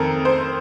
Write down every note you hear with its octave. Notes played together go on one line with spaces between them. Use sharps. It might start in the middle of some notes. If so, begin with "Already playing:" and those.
Already playing: F2 D#3 A4 A#4
C5